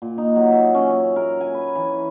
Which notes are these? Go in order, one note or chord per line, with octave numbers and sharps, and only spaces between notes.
A#2
D#4
F#3
E5
C#4
C#4
A#4
G#5
B4
E3